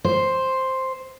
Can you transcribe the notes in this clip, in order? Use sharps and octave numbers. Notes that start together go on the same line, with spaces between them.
C5